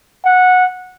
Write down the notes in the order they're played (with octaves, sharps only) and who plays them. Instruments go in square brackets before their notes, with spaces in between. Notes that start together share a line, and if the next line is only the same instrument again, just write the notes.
[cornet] F#5